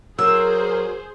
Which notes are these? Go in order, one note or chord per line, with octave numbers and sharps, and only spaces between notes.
F#3 G#4 A#4 C5 E6